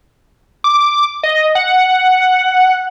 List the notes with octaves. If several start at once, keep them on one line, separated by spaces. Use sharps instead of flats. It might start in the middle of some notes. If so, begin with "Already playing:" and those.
D6
D#5
F#5